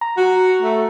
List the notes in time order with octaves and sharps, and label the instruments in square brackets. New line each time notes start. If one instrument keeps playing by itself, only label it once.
[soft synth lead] A#5
[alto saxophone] F#4
A3